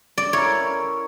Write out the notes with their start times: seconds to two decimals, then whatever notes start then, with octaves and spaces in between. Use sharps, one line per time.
0.18 D5
0.33 E4 A#4 C#5
0.59 C#4